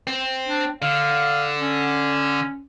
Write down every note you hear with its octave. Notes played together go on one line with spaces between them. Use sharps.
C4
D4
D3 F5
C#4